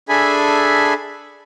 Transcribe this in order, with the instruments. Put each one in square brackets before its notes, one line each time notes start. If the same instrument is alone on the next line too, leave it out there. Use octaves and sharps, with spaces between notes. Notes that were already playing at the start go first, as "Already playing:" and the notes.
[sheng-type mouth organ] D4 G#4 A4 E5 G#5 B5